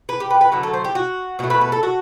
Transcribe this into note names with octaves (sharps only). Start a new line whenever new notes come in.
B4
G4
B4
B4
D3 F#3 A3 B4
A4
C5
G4
F#4
B2 A3 F#4
B4
B4
A4
F#4